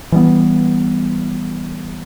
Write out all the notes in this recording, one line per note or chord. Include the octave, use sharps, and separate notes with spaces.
E3 G3 B3